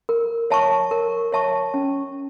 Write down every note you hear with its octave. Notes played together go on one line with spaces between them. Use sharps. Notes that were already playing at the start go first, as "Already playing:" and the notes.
A#4
C#5 E5 A5 C#6
A#4
C#5 E5 A5 C#6
C#4